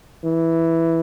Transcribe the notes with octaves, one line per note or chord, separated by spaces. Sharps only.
E3